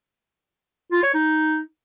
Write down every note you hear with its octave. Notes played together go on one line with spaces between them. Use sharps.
F4
C#5
D#4